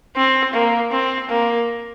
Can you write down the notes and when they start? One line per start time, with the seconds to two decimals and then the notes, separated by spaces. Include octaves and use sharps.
0.16 C4
0.54 A#3
0.91 C4
1.29 A#3